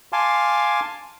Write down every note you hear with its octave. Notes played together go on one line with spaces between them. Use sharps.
F5 G#5 A5 C6 D6